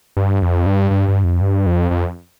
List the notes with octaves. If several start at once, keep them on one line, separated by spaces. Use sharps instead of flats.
G2
F2
G2
G2
G2
F2
G2
F2
F2